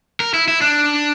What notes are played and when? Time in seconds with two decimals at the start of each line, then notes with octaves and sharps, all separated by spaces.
0.20 A#4
0.34 E4
0.48 E4
0.62 D4